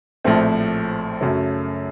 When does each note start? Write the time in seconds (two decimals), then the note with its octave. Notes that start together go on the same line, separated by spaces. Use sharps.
0.24 A#1 A2 F3 A3 C4
1.21 F#2 C#3 F#3 A3 C#4